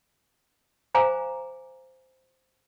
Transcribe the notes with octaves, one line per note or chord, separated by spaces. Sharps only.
C5 F5 G#5 A#5 D6